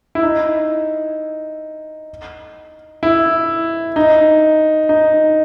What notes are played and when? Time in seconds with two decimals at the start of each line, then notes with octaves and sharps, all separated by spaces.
0.15 E4
0.23 D#4
3.03 E4
3.96 D#4
4.89 D#4